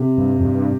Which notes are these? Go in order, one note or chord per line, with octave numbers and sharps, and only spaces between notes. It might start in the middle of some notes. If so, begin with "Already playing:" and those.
Already playing: C3
G2
F2
G2